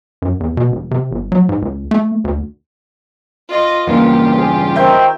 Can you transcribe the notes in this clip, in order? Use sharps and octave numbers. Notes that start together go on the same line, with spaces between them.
F#2
E2
B2
E1
C3
G1
F#3
G#2
C#2
A3
D2
F4 D#5
E2 G2 C#3 A#3 F4 G4
G#4
D#3 C4 E5 G5 G6